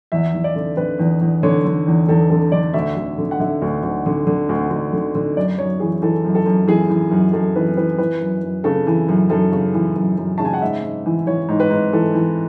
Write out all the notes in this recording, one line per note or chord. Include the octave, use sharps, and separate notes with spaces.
E2 E5
E2
D5
D3
D3 B4
E2
E2
D3 C#5
D3
E2
E2 A4
D3 A4
D3 D5
D2 E5
D2
D3
F#5
D3 E5
D2
D2
D3
D3
D2
D2
D3
D3
F#2 D5
F#2 C#5
E3 G#4
E3 A4
F#2
A4
F#2
E3 G#4
E3
F#2
F#2 A4
E3 B4
E3 B4
E3 B4
F#2
F#2
C#3 A4
E3
F#2
F#2 A4
C#3
E3
F#2
F#2
C#3 A5
G#5
F#5
G#2 E5
G#2
E3
E3 C#5
G#2
B4
G#2
E3 A4
E3